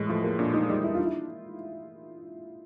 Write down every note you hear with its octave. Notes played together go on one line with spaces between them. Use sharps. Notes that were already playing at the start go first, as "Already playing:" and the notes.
Already playing: A2 E3 G#3
F3 A3
A#3
A#2 D4
D#4
G3 D#4
E4
D4 F4
E4